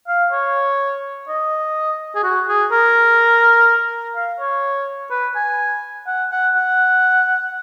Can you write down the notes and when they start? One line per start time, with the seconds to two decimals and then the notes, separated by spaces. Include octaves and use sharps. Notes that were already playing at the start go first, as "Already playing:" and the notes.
0.08 F5
0.32 C#5
1.29 D#5
2.15 G#4
2.24 F#4
2.48 G#4
2.72 A#4
4.16 F5
4.40 C#5
5.11 B4
5.36 G#5
6.07 F#5
6.31 F#5
6.55 F#5